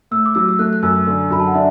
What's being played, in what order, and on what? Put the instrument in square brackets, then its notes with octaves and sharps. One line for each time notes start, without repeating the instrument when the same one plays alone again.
[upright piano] A2 [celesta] E6
[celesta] D6
[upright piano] F#3 [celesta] E6
[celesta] E6
[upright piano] A3 [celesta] F#6
[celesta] F#6
[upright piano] F#2 [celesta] E6
[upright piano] D3
[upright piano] F#2 [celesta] B5
[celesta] A5
F#5
[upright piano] D4 [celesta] E5